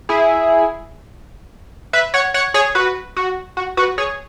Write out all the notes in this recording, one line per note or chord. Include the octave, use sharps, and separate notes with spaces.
E4 G#4
B4 E5
C#5 F#5
C#5 F#5
G#4 C#5
F#4 B4
F#4
F#4
F#4 B4
G#4 C#5